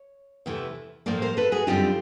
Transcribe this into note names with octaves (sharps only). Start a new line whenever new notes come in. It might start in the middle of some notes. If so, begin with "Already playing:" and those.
Already playing: C#5
E2 C3 E3 A3
A2 F3 A#3 C5 D5
A#4 C5
A4 B4
F#4 G#4
F#2 D3 G3 C4 D#4 F4 G4